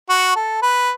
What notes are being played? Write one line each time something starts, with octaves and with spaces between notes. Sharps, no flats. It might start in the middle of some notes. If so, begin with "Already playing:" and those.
F#4
A4
B4